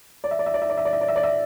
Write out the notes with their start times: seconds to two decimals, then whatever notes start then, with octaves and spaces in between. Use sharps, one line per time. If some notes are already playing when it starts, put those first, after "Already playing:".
0.24 D5
0.31 E5
0.39 D5
0.46 E5
0.54 D5
0.62 E5
0.70 D5
0.77 E5
0.85 D5
0.93 E5
1.01 D5
1.08 E5
1.16 D5
1.23 E5